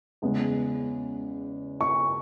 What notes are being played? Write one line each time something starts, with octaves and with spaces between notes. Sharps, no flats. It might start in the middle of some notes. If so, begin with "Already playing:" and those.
E2 C#3 G#3
C#6